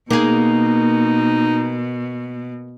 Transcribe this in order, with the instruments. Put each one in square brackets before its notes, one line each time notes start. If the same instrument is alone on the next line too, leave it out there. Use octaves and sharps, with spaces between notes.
[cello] B2 [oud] A#3 G#4 [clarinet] D#4